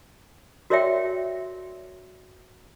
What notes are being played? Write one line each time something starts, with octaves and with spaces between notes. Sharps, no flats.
F#4 A#4 C#5 D5 E5 G5